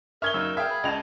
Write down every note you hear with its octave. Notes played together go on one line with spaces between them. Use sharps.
A#4 E5 C#6 D#6 F6 G#6 G7
F#2 C#3 D#4 E6
G#4 E5 F5 G5
B5
C#2 D#5 A5 F7